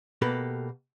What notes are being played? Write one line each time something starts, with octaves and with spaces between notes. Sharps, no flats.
B2 A#3 G4 A4 B4